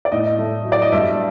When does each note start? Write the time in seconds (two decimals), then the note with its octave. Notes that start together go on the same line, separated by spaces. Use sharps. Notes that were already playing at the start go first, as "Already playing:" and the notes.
0.05 D5
0.12 A2 D#5
0.39 A3
0.65 F#3
0.72 D5
0.82 D#5
0.92 G2 E5